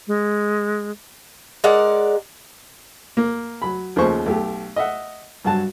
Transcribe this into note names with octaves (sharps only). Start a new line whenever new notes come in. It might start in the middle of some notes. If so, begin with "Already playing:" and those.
G#3
G#3 A#4 D5 F#5
A#3
F#3 B5
D#2 C#3 F3 A3 C5 C#6
B1 A3 G4
D#5 E5 F#5
G2 F#3 F#4 A5